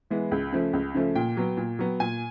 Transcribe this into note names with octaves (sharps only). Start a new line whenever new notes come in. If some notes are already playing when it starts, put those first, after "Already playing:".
E3 G#3 B3
C#2
C#3 F3 A3
C#2
C#3 F3 A3
A#2 G5
F#3 B3
A#2
F#3 B3
A#2 G#5